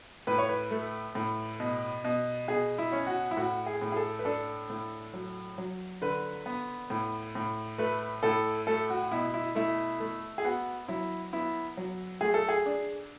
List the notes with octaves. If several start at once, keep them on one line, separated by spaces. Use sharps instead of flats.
A2 B4
C#5
B4
A3
A2
B2
B2
B2 G#4
E4
C#4
F#4
E4
A2 F#4
G#4
A2
G#4
A4
B4
D4 A4
A2
F#3
F#3
D3 B4
B3
A2
A2
A3 B4
A2 A4
A3 A4
F#4
B2 E4
E4
A3 E4
A3
G#4
B3 F#4
F#3 E4
B3 E4
F#3
A3 G#4
A4
G#4
D4